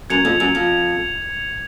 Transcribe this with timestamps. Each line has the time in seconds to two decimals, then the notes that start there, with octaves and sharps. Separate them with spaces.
0.10 F#2 G#6 C#7 F7
0.25 F2
0.40 F#2
0.55 F2